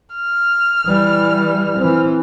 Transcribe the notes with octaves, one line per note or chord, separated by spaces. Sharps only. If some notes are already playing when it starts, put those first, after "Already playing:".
F6
E3 G3
E3 C4